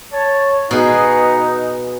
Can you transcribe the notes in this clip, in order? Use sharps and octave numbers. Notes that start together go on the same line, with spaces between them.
C#5 A5
B2 D#4 F#4 G#4 B4 F#5